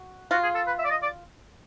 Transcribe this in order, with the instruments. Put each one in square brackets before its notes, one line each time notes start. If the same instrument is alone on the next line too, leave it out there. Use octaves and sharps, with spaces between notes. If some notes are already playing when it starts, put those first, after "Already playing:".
Already playing: [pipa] F#4
[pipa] F4 [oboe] F#4
[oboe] G#4
A4
B4
E5
D5
D#5
D5